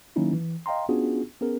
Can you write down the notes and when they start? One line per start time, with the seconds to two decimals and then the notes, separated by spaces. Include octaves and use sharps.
0.16 D#3 F#3 A#3 C#4 D#4 E4
0.33 E3
0.66 D#5 F5 G5 A#5 C6
0.89 B3 C#4 D4 F4 F#4 G#4
1.41 B3 C#4 G#4 A#4